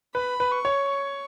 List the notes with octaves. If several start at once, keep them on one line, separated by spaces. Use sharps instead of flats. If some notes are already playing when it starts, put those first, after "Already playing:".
B4 B5
B4
C#6
C#5
C#6